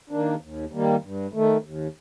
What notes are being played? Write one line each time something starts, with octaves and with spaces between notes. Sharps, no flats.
D#3 A#3 D4
D#2
D#3 G3 A#3
G2
D#3 A3
D#2